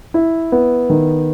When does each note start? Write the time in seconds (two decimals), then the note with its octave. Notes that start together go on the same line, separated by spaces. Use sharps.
0.14 E4
0.52 B3
0.90 D#3